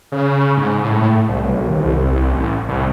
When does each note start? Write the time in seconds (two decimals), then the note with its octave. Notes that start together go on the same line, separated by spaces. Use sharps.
0.12 C#3
0.57 G#2
0.83 A2
1.28 C2
1.44 B1
1.68 D#2
1.81 C2
2.32 A1
2.68 C2